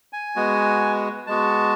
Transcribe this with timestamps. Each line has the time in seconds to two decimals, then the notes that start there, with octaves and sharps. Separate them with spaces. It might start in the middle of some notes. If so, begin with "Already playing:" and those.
0.13 G#5
0.36 G#3 B3 F#4
1.27 G#3 B3 F#4 A5